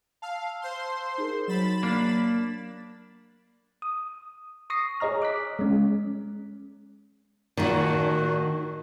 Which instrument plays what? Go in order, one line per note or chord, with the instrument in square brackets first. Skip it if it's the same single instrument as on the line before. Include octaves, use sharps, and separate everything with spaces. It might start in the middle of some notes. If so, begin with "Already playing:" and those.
[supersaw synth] F5 [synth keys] A5 E6
[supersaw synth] C5 C6
[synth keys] D#4 G#4 A#4
[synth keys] F#3 [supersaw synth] B5 A6 E7
[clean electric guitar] A#3 D4
[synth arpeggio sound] D#6
C#6 D#6 A#6 C7
G#4 C#5 D#5 A#5 F6
D6 F#6 B6
G#3 C#4
[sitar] A2 F#4 [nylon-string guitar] D#3 D#4